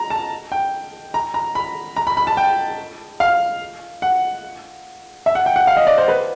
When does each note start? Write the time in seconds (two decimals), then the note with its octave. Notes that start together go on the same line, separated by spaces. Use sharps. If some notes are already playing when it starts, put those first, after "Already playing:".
Already playing: A#5
0.10 A5
0.52 G5
1.14 A#5
1.34 A#5
1.55 B5
1.96 A#5
2.07 B5
2.17 B5
2.27 A5
2.37 G5
3.20 F5
4.02 F#5
5.26 E5
5.35 F#5
5.46 G5
5.56 F#5
5.67 F5
5.77 D#5
5.87 D5
5.98 C5
6.08 B4